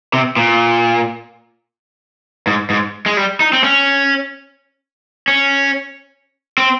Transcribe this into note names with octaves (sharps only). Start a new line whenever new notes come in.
C3
A#2
G#2
G#2
G#3
G3
D#4
C4
C#4
C#4
C4